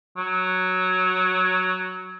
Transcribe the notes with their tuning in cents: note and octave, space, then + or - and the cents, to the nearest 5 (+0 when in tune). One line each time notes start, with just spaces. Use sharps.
F#3 +0